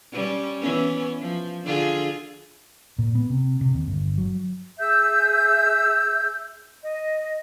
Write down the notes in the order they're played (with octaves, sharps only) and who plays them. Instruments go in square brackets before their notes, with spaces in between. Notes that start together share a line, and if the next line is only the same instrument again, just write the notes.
[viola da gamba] G3 C#4
E3 B3 C#4
F3
D3 F4 G#4
[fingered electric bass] A#2
B3
C3
C3
D#2
G1
F#3
[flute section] G#4 E5 E6 G6
D#5